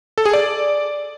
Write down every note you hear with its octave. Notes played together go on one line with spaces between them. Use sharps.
A4
G#4
D5